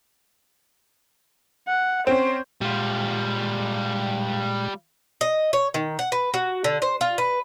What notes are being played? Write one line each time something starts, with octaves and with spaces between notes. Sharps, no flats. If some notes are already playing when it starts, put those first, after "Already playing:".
F#5
C4 C#4 C5
A#2 G3 G#3 F4 F#6
D#5
C#5
D#3
F#5
B4
F#4
D3
C5
F4
B4